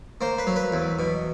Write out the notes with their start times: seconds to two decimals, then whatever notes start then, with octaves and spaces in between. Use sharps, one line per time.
0.21 A#3 C5
0.38 B4
0.47 F#3
0.56 B4
0.72 E2
0.99 B2